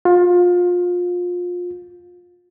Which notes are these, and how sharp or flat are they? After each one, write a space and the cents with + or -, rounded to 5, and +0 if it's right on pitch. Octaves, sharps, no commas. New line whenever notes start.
F4 +25